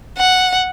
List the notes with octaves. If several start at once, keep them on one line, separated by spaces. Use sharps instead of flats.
F#5